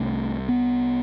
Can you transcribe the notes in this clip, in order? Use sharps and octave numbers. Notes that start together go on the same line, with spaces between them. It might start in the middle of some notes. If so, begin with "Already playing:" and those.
Already playing: C2 C3 A3
B3